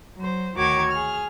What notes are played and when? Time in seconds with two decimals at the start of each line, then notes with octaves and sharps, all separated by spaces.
0.16 F#3 C5
0.55 D2 D#3 F#4 C#5 D6 G#6
0.91 G#4 F6